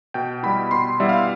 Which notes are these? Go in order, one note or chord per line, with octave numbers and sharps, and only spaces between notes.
B2 G5
G3 B3 E4 B5
B2 C6
G3 B3 E4 E5
F5